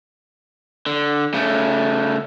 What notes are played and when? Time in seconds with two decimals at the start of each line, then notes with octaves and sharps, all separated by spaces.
0.86 D3
1.34 C#3 A3